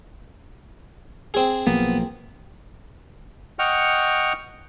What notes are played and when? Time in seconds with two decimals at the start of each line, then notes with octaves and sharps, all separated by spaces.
1.34 C4 G#4
1.67 B1 F3 A#3 B3
3.59 D#5 F#5 G5 C#6 F6